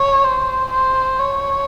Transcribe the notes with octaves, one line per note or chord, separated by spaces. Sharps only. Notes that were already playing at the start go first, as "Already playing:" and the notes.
Already playing: C#5
C5
C5
C#5